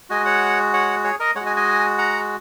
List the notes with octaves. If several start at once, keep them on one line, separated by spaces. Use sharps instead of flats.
G#3 F#4 D#5 G#5
C#5 F#5
C#5 F#5
G#4 C#5
A#4 D#5
G#3 C#5 F#5
F#4
D#5 G#5
D#5 G#5
F#5 A#5